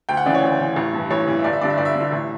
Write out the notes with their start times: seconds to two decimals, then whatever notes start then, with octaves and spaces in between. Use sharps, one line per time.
0.09 D2 G5
0.17 F#5
0.26 C#3 E3 D5
0.34 C#5
0.42 D2
0.60 C#3 E3
0.76 A1
0.93 G2
0.98 E3
1.11 A1 C#5
1.28 G2 E3
1.39 E5
1.44 G1 D5
1.53 E5
1.61 G2 D3 D5
1.70 E5
1.78 G1 D5
1.85 E5
1.95 G2 D3
2.12 A1